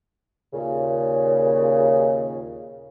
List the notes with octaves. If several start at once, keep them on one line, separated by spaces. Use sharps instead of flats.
D#2 A#2 C#3